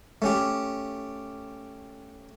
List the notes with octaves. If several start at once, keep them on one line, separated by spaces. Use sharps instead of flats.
A3 C#4 G4